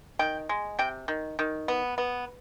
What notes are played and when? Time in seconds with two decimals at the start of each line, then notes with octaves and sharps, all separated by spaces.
0.19 D#3 G5
0.49 G#3
0.79 C3 G5
1.08 D#3
1.39 D#3
1.68 B3
1.98 B3